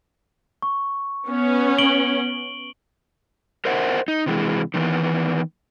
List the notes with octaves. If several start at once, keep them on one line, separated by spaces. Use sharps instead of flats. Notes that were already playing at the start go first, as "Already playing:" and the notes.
C#6
B3 C#4
D7 F#7 G7
A#4 C5 D#5 E5 F#5
D#4
C3 E3 G#3
D#3 E3 B3